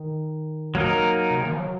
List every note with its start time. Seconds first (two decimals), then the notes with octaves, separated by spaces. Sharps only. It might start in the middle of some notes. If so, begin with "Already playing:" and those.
Already playing: D#3
0.75 F#3 A#3 D#4 A#4
1.31 C3
1.39 C#3
1.45 D#3
1.53 F3
1.60 F#3